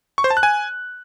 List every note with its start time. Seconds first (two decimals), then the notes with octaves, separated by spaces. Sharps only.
0.18 C#6
0.24 C5
0.30 A5
0.37 F#6
0.43 G#5